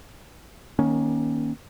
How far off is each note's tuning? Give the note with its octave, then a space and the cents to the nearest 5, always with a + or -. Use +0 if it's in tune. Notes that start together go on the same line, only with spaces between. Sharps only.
D#3 +0 A#3 +25 C#4 +0